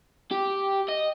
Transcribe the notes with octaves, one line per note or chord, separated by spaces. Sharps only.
G4
D#5